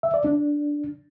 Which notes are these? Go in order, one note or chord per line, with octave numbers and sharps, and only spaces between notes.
E5
D5
D4